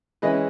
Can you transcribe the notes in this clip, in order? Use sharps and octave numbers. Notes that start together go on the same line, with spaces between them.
E3 G#3 C#4 E4 B4 D#5